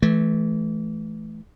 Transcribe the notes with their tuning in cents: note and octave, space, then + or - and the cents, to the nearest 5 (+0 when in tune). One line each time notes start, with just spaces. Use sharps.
E3 +0 A3 -30